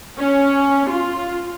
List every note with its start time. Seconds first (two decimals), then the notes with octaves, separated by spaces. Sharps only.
0.19 C#4
0.89 F4